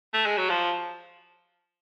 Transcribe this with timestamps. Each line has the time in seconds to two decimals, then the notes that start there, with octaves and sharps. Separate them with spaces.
0.14 A3
0.26 G#3
0.38 F#3
0.50 F3